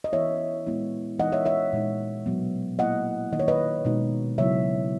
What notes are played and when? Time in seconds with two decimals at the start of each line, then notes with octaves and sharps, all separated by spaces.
0.04 D#5
0.12 E3 B3 E4 C#5 E5
0.67 A#2 G#3 B3 E4
1.19 E3 G#3 D#4 D#5 F#5
1.32 C#5 E5
1.45 C#5 E5
1.73 A#2 G#3 D#4
2.26 B2 F#3 B3
2.79 A#2 A#3 E4 D#5 F#5
3.32 D#3 A#3 D#4 D#5
3.40 C#5
3.48 B4 D#5
3.85 B2 G#3 D#4
4.38 C#3 F#3 B3 E4 C#5 E5